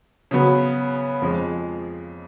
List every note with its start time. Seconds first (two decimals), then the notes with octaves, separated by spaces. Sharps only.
0.31 C#3 F#3 B3
1.22 F2 F3 G#3